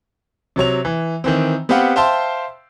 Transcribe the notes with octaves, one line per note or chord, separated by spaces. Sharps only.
C3 F#3 C#5 F7
E3
D#3 E3 C4
B3 C4 G4 B4 F5 F#5
C5 E5 F5 G5 A5 C6